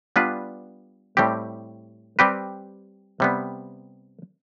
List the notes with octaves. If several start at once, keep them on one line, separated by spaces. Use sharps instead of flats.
G3 B3 D4 F4 B4
A2 G3 C4 G4
G3 C4 G4 B4
C3 G3 B3